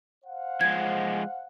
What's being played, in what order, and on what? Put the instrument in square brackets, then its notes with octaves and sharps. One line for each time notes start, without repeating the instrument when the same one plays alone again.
[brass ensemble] C5 F5 F#5
[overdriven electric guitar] F3 G#3 [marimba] G#6